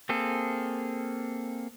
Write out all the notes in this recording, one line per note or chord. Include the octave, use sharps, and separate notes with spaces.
A#3 C4 G#4 A4